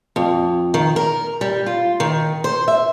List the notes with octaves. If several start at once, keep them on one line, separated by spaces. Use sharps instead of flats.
F2
D#3
A#4
G3
F4
D#3
C5
E5